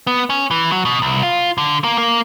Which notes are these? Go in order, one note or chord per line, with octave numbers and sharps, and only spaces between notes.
B3
C#4
E3
F#3
B2
C2
F4
D3
A#3
A#3